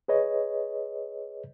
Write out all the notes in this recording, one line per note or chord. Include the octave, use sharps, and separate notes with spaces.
G#4 B4 C#5 D#5